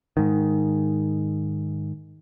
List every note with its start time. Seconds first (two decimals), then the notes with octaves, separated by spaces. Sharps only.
0.17 G#2 D#3